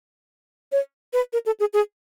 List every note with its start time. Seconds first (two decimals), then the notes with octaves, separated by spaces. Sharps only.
0.72 C#5
1.13 B4
1.33 A#4
1.46 A4
1.60 G#4
1.74 G#4